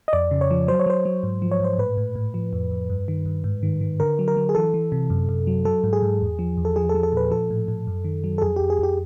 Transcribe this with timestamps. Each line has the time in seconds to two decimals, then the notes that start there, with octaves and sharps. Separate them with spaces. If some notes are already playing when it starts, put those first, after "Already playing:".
0.08 D#5
0.13 F2 D5
0.31 C#3
0.41 C#5
0.51 F3
0.68 F#3 C5
0.80 C#5
0.86 F#3 C5
1.05 F#3
1.23 G#2
1.42 F3
1.52 C#5
1.60 G#2 C5
1.78 A2 B4
1.97 A2
2.15 A2
2.34 F3
2.53 F2
2.71 F2
2.90 G2
3.08 D#3
3.26 G2
3.44 G#2
3.63 D#3
3.81 D#3
4.00 D3 A#4
4.19 F#3
4.28 A#4
4.37 F#3
4.49 G#4
4.55 E3 A4
4.74 E3
4.92 C3
5.10 F#2
5.29 F#2
5.47 F#3
5.65 F#3 A4
5.84 G#2
5.93 G#4
6.03 G#2
6.21 E2
6.39 F3
6.57 E2
6.65 A4
6.76 F3 G#4
6.89 A4
6.95 F3
7.03 A4
7.12 A#2 B4
7.31 F3 A4
7.50 A2
7.68 A2
7.87 F#2
8.05 D#3
8.24 F#3
8.38 A4
8.42 F2 G#4
8.56 F2 G4
8.70 G#4
8.79 F2 G4